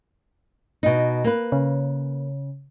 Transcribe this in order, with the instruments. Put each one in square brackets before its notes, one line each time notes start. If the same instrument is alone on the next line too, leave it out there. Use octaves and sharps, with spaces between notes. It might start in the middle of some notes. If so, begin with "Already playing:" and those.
[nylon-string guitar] B2 D#4
A#3 B4
[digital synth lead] C#3